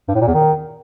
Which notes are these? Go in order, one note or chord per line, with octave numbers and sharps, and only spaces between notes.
G2
A2
A#2
E2
D#3